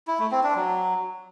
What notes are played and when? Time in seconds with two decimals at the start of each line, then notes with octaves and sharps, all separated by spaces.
0.07 E4
0.19 A3
0.31 C4
0.43 D4
0.55 F#3